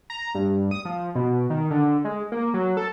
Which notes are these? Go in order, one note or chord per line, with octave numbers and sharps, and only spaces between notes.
A#5
G2
D#6
F3
B2
D#3
D3
G#3
A#3
F#3
A4